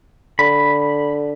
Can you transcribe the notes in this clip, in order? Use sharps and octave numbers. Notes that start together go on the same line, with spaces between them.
D3 B5